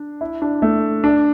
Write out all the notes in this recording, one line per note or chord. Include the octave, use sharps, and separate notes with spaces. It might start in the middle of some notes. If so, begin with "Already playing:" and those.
Already playing: D4
E4
D4
A3
D4